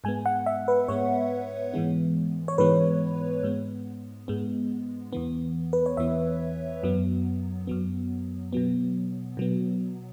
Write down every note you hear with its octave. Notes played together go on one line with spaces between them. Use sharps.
G#2 G#3 B3 G#5
F#5
E5
B4
G#2 G#3 B3 C#5
G#2 E3 G#3 B3
C#5
G#2 E3 G#3 B3 B4
G#2 G#3 B3
G#2 G#3 B3
E2 E3 B3
B4
C#5
E2 E3 B3 E5
F#2 F#3 B3
F#2 F#3 B3
B2 F#3 B3
B2 F#3 B3